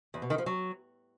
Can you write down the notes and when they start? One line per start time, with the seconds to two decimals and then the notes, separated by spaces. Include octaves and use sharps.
0.14 E2
0.22 B2
0.30 D#3
0.38 F3
0.46 F#3